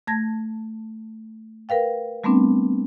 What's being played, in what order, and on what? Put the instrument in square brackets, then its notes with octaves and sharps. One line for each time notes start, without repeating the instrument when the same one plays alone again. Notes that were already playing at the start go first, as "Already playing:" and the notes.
[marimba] A3 A5 G#6 A#6
A#4 B4 F5 G5
G3 A3 B3 C4 D4